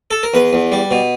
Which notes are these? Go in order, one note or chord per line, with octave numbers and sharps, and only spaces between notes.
A4
A#4
E2 B4
E2
G3
B2